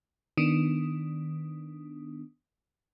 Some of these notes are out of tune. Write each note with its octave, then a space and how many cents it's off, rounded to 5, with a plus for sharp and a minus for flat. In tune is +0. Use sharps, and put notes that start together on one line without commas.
D#3 +0 B3 +0 D4 +0